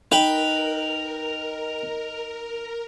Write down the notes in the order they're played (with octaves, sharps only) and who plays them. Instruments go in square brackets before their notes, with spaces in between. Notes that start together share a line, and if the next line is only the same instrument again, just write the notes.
[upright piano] D#4 D#5 [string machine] A#4 [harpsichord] B4 G5 B5 [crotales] F7